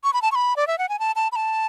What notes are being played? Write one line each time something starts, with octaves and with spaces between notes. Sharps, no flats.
C#6
B5
A5
C#6
B5
D5
E5
F#5
G#5
A5
A5
B5
A5